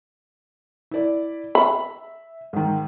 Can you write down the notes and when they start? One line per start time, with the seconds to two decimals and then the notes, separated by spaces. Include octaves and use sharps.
0.91 E4 D5
1.55 E5 B5
2.53 G#2 D#3